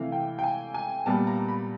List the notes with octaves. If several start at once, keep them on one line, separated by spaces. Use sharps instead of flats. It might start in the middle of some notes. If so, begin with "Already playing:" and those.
Already playing: C3 E3 A3 F5
G5
G5
G#5
G#5
A#2 G3 B3 A5
A#5
B5